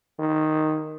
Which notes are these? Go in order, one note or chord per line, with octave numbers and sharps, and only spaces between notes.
D#3